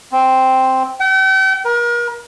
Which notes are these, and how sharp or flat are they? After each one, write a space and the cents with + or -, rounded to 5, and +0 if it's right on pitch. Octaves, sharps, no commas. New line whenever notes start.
C4 +0
G5 -45
A#4 +35